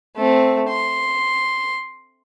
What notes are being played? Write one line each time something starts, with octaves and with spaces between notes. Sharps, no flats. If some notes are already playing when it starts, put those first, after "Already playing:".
A3 C4
C6